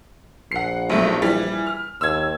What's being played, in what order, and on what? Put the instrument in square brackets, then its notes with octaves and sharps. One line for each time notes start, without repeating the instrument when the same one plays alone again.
[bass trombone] A#1 [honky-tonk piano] F#5 C7
[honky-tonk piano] B1 A3
E3 G3
F6
[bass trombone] D#2 [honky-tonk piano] E6 G#6